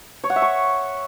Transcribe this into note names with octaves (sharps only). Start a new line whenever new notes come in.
C#5
F#5
E5
C#6